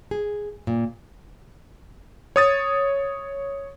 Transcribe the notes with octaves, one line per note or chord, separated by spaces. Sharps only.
G#4
A#2
C#5 D#6 A6